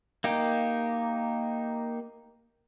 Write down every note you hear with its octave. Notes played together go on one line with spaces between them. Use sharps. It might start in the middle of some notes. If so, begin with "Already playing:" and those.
A#3 D#4 G4